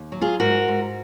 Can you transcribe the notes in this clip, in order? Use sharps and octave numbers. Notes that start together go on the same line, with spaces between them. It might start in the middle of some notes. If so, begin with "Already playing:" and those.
Already playing: D#2
F#3
F4 G#4
G#2 F#4 A#4
G#2